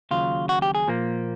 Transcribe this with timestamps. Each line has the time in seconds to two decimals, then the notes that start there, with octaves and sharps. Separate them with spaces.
0.11 D#2 C#3 F#3 F4
0.49 F#4
0.62 G4
0.75 G#4
0.88 A#2 F3 A#3